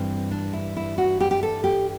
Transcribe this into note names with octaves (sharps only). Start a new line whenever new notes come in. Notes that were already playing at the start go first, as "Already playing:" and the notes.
Already playing: G2 E3 G3 C4
D4
E4
E4
F#4
G4
G4
A4
G4